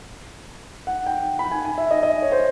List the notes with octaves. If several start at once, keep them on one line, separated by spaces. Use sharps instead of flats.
F#5
G5
B5
G#5
G#5
E5
D#5
D#5
C#5
C5